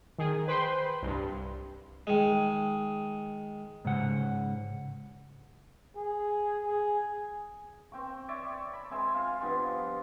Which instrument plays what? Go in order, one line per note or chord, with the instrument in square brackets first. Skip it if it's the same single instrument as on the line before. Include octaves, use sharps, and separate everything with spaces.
[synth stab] D#3 G#4
B4 C5 G5 B5 C6
C2 G2
[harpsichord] D#3 G#3
[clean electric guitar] G#2 C#3 F#5
[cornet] G#4
G#4
[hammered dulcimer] C4 G5 C#6
C#5 D5 E5
B5
G#3 C4 E5 G#5
F4 F5
G2 F3 B3